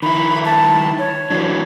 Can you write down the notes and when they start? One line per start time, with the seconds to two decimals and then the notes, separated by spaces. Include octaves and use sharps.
0.02 D#3 E4 B5
0.45 A5
0.99 C#5
1.30 E3 F#3 D4